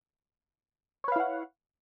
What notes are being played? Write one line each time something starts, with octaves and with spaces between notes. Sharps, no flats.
E4 B4 C#5 F5 F#5